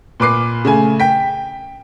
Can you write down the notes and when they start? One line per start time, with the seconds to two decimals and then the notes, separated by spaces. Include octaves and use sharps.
0.20 A#2 B4 D6 C7
0.65 C#3 A3 G#5
1.00 G5 B6